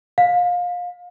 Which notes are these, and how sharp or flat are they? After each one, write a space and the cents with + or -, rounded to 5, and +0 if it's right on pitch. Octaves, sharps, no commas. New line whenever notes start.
F5 +25